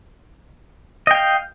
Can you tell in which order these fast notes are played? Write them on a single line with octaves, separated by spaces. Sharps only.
D#5 G5 F5